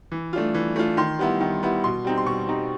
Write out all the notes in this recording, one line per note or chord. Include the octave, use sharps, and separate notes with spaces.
E3
A3 D4 F4
E3
A3 D4 F4
D#3 C6
G3 B3 E4
D#3
G3 B3 E4
B2 C6
G3 C4 D#4
C6
B2 C#6
G3 C4 D#4